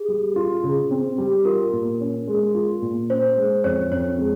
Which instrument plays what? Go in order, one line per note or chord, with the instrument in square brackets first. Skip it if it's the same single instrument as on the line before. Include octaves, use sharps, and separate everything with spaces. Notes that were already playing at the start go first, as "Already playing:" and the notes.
Already playing: [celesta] G4 G#4
[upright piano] G3
F4
C#3
C4
G3
[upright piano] F4 [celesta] A#4
[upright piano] A#2
C#4
G#3
F4
A#2
[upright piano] C#4 [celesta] C5
[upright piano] G#3
[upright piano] F2 [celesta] C#5
[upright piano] F2 [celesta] C#5
[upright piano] G#3